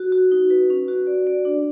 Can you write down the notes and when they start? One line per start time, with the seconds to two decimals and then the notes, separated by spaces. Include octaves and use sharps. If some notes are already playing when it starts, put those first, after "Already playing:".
Already playing: F#4
0.12 F#4
0.32 D#4
0.50 B4
0.70 C#4
0.88 F#4
1.07 D5
1.27 D5
1.45 D4